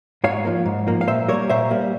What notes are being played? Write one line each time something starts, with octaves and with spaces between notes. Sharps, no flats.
G#2 C#5 F5
F3 A#3
G#2
F3 A#3
F5
A#2 C5 E5
G3 A#3 A#4 C#5
A#2 C5 E5
G3 A#3